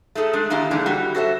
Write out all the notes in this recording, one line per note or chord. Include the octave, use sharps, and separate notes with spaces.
A3 D#4 G#4 A4
G#3 D4 G#4
D#3 A#3 D4 E4 G4 G#5
D3 E3 G#3 D4 D#4
G3 F#4
F#4 A4 C5 E5